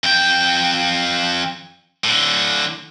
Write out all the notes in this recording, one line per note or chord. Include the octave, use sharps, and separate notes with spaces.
F2 G5
A2 D3